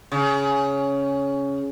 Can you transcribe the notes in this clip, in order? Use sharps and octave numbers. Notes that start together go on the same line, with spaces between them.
C#3